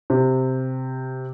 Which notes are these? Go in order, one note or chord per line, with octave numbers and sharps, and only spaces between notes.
C3